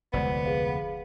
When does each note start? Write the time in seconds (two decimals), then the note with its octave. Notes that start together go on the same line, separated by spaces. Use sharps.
0.13 F1 D2 G#3 B3 C5 D5 F#5
0.45 G#4 B4 F5